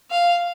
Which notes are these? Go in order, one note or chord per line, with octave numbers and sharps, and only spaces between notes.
F5